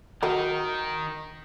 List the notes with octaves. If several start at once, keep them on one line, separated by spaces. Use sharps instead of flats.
D#3 F#3 D#4 A#4